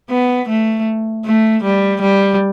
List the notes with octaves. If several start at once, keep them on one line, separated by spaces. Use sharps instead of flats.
B3
A3
A3
G3
G3